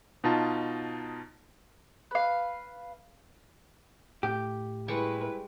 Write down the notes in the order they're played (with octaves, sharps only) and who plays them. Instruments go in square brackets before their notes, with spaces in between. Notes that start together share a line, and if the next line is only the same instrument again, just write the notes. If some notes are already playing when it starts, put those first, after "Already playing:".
[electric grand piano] B2 D#4 F4 A5
[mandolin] B4 F5
[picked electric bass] A2 [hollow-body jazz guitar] G4
[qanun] G3 G#3 C#6 [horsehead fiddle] E4 B4